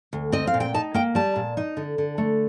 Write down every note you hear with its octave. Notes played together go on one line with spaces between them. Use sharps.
D2
C4 D#5
F5
A#2
G5
D#4 A5
A#3 G5
G3 A5
A#2
D#4
D3
D3
A3